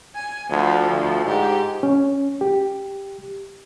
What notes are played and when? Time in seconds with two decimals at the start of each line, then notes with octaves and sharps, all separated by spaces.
0.15 G#5
0.50 D2 F3
0.92 D2
1.26 G#2 G4
1.83 C#4
2.41 G4